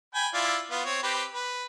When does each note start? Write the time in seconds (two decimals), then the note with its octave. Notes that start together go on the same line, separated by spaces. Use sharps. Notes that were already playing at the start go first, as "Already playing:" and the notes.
0.15 G5 G#5 B5
0.34 E4 F4 D5
0.71 B3 F4
0.85 C4 C#5
1.03 C4 G4 B4
1.34 B4